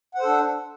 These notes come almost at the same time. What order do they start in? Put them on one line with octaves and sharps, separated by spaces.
F#5 C5 A4 D4